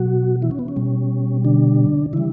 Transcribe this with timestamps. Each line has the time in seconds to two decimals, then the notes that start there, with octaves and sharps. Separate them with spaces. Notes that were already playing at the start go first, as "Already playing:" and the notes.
Already playing: B2 F#3 F#4
0.42 E3 E4
0.51 C#4
0.59 B3
0.68 C#4
0.76 B2 G3
1.45 D3 D4
2.13 C#3 E3 G3 E4